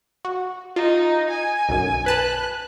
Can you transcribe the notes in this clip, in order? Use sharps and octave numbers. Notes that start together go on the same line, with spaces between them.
F#4
D#4 F4
G#5
B1 F#2
B4 A5 B5 F#6